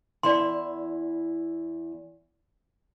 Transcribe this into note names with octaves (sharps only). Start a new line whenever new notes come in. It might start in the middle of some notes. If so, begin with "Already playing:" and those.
E2 E4 D5 A5 C6